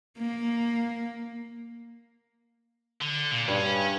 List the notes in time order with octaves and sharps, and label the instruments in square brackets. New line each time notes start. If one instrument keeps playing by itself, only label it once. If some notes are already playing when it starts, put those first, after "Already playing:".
[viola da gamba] A#3
[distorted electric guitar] D3
A#2
[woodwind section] G2 [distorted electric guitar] C#4